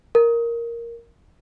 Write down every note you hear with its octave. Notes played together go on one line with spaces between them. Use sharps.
A#4